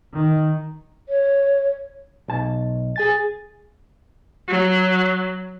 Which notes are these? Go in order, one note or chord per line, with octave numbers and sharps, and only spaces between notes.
D#3
C#5
B1 A5
G#4 G#5 A6
F#3